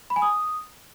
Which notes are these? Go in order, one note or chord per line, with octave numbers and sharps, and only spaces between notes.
B5
G#5
D#6